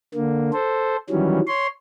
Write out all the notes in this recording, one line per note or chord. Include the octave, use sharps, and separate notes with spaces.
D3 A#3
A4 C5
D#3 E3 F#3 G3 C#4
C#5 C6